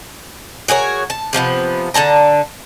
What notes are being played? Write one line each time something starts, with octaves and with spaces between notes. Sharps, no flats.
F#4 G#4 A#4 C#5
A5
C3 F3 A3 B3
D3 C#5 A5 A#5